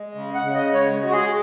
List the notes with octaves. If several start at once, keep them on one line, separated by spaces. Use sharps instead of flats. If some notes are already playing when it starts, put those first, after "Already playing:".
Already playing: G#3
C#3
F#5
C#3
D#5
G#3 C#5
G#3 F#4
G#4